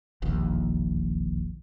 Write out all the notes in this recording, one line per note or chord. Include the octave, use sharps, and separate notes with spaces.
E1 A#1 D#2